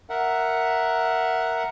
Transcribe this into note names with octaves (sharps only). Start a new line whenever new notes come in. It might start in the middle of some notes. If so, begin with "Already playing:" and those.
A#4 E5 F#5